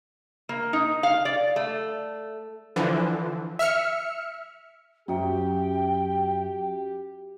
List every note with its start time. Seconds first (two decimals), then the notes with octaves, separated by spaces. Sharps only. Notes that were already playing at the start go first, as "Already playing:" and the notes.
0.49 A#3
0.73 D#4
1.03 F5
1.25 D5
1.56 A3
2.76 D3 E3 F3
3.59 E5 F6 C#7
5.08 F#2 C#4 F#4 G4 E5 G5